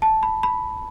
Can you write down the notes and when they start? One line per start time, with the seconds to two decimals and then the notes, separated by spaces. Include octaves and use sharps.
0.02 A5
0.23 B5
0.43 B5